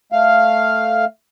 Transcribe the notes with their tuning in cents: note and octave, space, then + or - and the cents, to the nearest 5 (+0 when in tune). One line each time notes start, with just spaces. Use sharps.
A3 +0 F5 +0